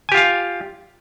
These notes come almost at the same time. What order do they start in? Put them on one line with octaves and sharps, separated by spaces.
G#5 G4 F4 F5